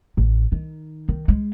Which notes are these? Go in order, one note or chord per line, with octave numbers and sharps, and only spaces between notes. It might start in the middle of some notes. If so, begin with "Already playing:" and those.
A1
D#3
D#3
G#3